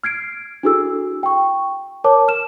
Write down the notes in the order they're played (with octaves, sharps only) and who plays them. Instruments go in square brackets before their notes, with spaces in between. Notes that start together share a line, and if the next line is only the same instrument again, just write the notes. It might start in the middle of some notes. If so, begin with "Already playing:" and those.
[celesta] F6 G#6 C7 D7
D4 E4 F#4 G#4 A4 E6
G5 C#6
A#4 C#5 A5 D6
F6 E7